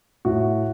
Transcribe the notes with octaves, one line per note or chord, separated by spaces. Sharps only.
A2 F#4